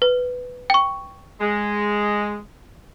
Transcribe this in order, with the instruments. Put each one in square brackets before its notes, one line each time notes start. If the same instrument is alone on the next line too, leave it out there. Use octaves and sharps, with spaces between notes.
[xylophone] B4
G5 C#6
[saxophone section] G#3